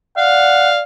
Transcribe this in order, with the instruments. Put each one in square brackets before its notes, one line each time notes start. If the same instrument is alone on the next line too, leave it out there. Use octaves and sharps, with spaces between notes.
[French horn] D5 [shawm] F5 [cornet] F#5